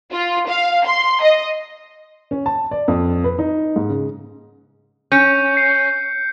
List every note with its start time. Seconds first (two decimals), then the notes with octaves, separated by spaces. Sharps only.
0.12 F4
0.48 F5
0.86 C6
1.23 D#5
2.31 C#4
2.46 A5
2.71 D5
2.88 F2
3.24 B4
3.39 D#4
3.76 G#2
3.90 C#3
5.12 C#4 G6 C#7
5.57 C7